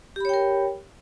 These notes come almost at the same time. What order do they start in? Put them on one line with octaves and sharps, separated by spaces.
G4 B5 C#5 G5 A#4